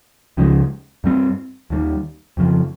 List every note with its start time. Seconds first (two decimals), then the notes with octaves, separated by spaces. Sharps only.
0.37 C#2 C#3 F3 G#3
1.04 G2 G3 C4
1.70 D#2 D#3 G3
2.37 F2 C#3 F3